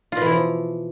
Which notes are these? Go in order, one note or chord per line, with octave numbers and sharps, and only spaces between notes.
B2 E3 F3 E4 F4